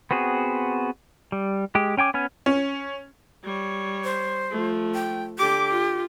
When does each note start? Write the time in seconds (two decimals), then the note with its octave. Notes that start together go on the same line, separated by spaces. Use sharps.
0.11 B3 C4 F#4 G#4
1.32 G3
1.75 G#3 G4
1.97 C#4 G5 G#5 D6
2.14 B3 C#4 G#5 F6
2.46 C#4
3.44 G3 C#5
4.04 C5
4.51 F3 A3
4.94 G5
5.38 D3 G4 D6
5.69 F4